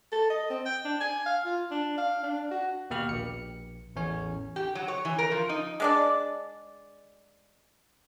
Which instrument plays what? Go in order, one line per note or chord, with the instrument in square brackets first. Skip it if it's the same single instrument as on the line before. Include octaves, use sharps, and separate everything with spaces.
[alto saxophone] A4
D#5
C4
G5
D4
G#5
F5
F4
D4
F5
D4
F#4
[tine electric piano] D#2 B2 A#3 G4 F6
A#1 C#7
A1 E2 C#4 C#5
[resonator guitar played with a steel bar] G4
F#3
C#5
E3
A#4
F3
D#4
[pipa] G#3 D4 D5